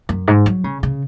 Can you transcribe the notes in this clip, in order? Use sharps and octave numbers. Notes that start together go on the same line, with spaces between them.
F#2
G#2
F#3
C#3
C#3